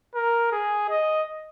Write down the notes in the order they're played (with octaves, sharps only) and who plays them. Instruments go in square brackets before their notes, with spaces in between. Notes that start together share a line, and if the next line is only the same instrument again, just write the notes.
[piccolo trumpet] A#4
G#4
D#5